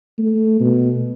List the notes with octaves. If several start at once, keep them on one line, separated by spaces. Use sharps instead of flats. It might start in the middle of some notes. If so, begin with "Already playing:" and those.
A3
B2